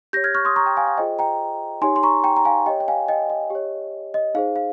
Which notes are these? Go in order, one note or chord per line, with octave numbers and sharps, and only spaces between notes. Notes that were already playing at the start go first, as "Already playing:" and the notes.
G4 C#5 G6 A#6
F6 G#6
C#6 F6
C6 D#6
A#5 C#6
G5 A#5
F5 G#5
F5
F4 G#4 C5 D#5 G5
G5 A#5
D#4 G4 C#5 G#5 C6
C6
A#5 C#6
G5 A#5
A#5
F5 G#5
G4 C#5 D#5 G5
G5
F5 G#5
D#5 G5
D#5
G4 C#5
D#5
D#4 G#4 C5 F5
F5